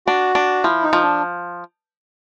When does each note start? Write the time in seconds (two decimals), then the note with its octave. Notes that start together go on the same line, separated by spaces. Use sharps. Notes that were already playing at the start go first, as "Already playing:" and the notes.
0.07 D4 F#4
0.35 D4
0.64 F3 E4
0.83 D#4
0.93 F3
1.03 D4